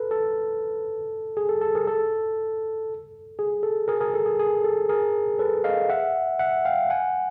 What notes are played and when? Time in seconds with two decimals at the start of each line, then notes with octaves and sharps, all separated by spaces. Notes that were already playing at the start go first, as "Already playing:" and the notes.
Already playing: A4 B4
0.11 A4
1.37 G#4
1.49 A4
1.61 A4
1.75 G#4 A#4
1.87 A4
3.39 G#4
3.63 A4
3.88 G#4 A#4
4.00 G#4 A#4
4.14 A4
4.26 G#4
4.39 G#4
4.64 A4
4.89 G#4 A#4
5.39 A4 B4
5.64 D#5 F5
5.90 E5 F#5
6.39 E5 F#5
6.65 F5 G5
6.90 F#5 G#5